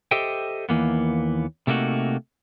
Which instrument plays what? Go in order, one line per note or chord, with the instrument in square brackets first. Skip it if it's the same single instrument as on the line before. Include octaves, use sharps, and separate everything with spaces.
[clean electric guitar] G4 A4 C5 D#5 E5 G5
D#2 E3 A#3 B3
C3 A3 A#3 D#4 F#4